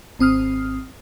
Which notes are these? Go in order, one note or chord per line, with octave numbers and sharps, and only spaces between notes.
G#1 C4 D#6 F6 C7